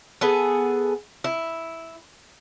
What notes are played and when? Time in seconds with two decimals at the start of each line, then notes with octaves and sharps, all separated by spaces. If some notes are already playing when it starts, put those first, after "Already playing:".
0.21 B3 G#4 A4
1.24 E4